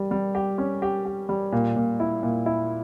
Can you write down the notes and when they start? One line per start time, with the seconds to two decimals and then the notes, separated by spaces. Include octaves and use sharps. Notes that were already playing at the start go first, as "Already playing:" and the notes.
Already playing: G3 G4
0.11 G3
0.35 G4
0.58 C#4
0.82 G4
1.05 G4
1.29 G3
1.52 A#2
1.76 A#2
2.00 E4
2.23 A#2
2.46 E4